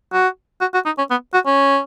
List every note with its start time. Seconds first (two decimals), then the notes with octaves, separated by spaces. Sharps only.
0.13 F#4
0.61 F#4
0.74 F#4
0.86 D#4
0.98 C#4
1.10 B3
1.34 F#4
1.46 C#4